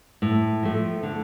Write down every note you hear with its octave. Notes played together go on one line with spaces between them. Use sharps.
A2
F3 A3
D3